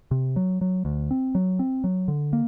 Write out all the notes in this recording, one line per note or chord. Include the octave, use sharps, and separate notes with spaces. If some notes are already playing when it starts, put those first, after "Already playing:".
C3
F#3
F#3
D2
C4
F#3
C4
F#3
D3
A#3